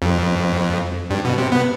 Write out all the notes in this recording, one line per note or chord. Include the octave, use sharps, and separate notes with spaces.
F2
G2
B2
C3
B3